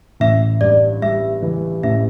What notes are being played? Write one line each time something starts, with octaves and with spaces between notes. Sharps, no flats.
A1 E5
G2 D5
G3 E5
E3
A1 E5